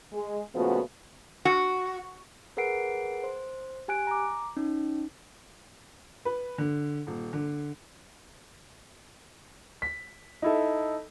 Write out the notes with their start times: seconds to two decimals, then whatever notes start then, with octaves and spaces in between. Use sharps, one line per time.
0.12 G#3
0.54 A#2 C#3 F3 A3 B3 F#4
1.45 F#4
2.57 G#4 A#4 B4 F#5 C7 D7
3.24 C5
3.88 G4 G#5 F#6 D7
4.07 A#5 D6
4.57 C#4 D#4
6.25 B4
6.58 D3
7.07 D#1
7.33 D3
9.82 B6
10.42 D#4 E4 A4